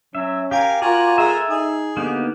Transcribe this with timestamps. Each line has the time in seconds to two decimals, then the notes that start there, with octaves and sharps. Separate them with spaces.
0.15 F#3 C#4 E5
0.51 G4 A#4 F5 G#5
0.82 F4 F#4 A#4 D5 G#5
1.18 G#3 A4 A#4 E5
1.49 D#4 G#4
1.97 D3 A#3 B3 D#4 G4